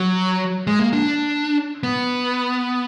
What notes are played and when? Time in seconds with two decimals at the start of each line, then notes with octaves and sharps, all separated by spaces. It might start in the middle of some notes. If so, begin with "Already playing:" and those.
Already playing: F#3
0.67 G#3
0.79 A#3
0.93 D4
1.83 B3